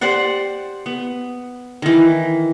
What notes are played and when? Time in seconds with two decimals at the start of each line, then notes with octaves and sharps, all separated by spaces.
0.01 G4 C5 D5 F#5
0.86 B3
1.82 D#3 E3